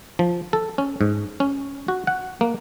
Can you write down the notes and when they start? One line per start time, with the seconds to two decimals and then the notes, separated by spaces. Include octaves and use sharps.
0.19 F3
0.53 A4
0.78 C#4
1.01 G#2
1.40 C#4
1.88 F#4
2.07 F#5
2.41 A#3